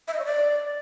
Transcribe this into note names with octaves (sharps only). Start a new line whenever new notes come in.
E5
D#5
C#5
D5